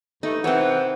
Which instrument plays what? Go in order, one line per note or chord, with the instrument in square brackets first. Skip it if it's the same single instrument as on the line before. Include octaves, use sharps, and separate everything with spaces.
[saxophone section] G2 A3 [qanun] D#4
[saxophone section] C3 D#3 E3 [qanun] C4 C#5 [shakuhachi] F#5